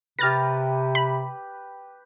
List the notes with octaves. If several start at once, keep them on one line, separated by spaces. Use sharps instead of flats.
C3 G4 B4 F6 A6 A#6
B5